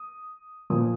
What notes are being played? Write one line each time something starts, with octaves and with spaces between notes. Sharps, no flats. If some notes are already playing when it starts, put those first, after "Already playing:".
Already playing: D#6
A#2 F3 D#6